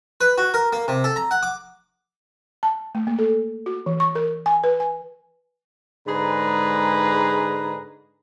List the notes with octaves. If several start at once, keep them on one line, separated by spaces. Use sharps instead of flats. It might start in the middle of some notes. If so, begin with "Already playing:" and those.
B4
F#4
A#4
A#3
C3
A4
A#5
F#5
D6
A5
A3
A#3
A4
F#4
E3
C#6
A#4
G#5
B4
G#5
G#2 D3 G#3 G#4 B4 A#5